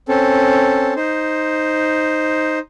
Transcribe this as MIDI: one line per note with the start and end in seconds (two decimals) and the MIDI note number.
0.08 0.94 60
0.08 0.94 61
0.08 0.94 69
0.96 2.59 63
0.96 2.59 72